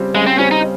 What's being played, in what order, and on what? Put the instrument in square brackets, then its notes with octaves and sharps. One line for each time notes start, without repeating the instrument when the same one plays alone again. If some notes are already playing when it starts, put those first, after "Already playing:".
Already playing: [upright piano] C#3 G3 C4
[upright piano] C#3 [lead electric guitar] G#3
[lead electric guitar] C4
[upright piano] G3 C4 [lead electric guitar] C#4
[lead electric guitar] D#4